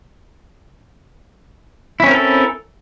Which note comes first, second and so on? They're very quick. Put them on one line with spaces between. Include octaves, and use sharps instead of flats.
E4 C#4 C4 A#4 A4